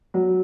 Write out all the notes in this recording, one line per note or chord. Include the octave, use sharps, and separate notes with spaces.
F#3